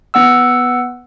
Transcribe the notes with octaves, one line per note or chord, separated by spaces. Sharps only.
B3 F#5 E6